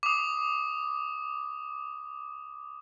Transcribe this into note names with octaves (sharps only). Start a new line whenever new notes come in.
D6 D#6